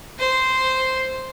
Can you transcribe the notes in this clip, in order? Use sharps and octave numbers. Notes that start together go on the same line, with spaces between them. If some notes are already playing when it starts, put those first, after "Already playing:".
C5